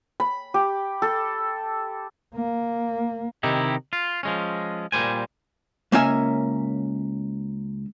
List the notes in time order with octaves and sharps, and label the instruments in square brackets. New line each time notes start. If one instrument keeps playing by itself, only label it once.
[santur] B5
G4
A4
[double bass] A#3
[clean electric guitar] C3 D#3 D#4 E4 G4
F4
F3 G#3 C#4
A#2 G3 C5 G#5
[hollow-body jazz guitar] C#2 A#3 C#4 A#4 E5 G#5